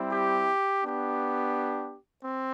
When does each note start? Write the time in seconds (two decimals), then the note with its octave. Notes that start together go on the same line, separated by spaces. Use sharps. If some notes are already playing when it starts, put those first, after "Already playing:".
Already playing: G3 C4 E4
0.10 G4
0.82 B3 D4 G4
2.24 C4